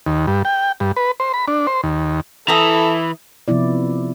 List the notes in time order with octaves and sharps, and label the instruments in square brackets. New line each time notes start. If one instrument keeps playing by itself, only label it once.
[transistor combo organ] D#2
G2
G5
G2
B4
C5
B5
D4
C5
D#2
[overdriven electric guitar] E3 [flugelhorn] E4 [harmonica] A4 [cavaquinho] A#5 D#6
[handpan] C3 F3 B3 E4 D5